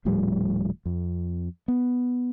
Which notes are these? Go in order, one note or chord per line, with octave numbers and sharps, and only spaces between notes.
D#1 A2 F3 G3
F2
B3